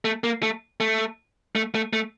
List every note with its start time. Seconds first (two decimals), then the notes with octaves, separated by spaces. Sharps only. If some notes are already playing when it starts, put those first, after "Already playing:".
0.05 A3
0.24 A#3
0.43 A3
0.80 A3
1.55 A3
1.75 A3
1.93 A3